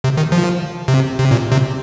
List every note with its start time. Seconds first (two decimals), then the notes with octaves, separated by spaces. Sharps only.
0.04 C3
0.17 D#3
0.32 F3
0.88 C3
1.19 C3
1.31 A#2
1.52 C3